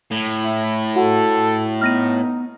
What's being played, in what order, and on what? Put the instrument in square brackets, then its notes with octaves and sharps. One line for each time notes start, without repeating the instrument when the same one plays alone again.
[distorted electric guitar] A2
[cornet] E4
[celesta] F#4 F#5 [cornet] A4
[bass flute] B3 [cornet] D#4 [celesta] F6 A#6 D#7